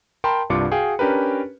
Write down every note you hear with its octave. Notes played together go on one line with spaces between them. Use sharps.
A#4 G5 A5 B5 C6
C2 G2 D4 F4 D6 C#7
F#4 G#4 F5 G5
C#4 D4 G4 A#4 B4